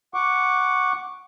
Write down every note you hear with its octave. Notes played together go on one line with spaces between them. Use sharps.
F#5 C#6 D6